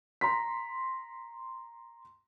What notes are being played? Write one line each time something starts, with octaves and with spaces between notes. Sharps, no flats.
A#5 C6 B6